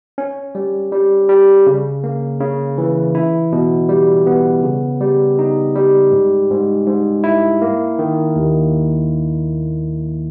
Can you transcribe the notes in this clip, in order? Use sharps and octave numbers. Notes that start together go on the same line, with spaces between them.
C#4
G3
G3
G3
C#3
A#3
C#3
E3
E4
B2
G3
B3
C#3
G3
D#4
G3
G#2
G#2
G#2
E4
A#3
D#3
D#2